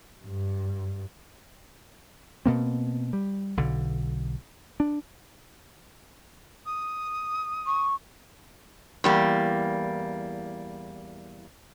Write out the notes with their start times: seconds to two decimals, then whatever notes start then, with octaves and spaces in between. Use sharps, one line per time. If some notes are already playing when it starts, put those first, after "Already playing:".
0.25 G2
2.46 B2 A#3 C4
3.13 G3
3.57 B1 D3
4.80 D4
6.65 D#6
7.66 C#6
9.04 E2 G3 A#3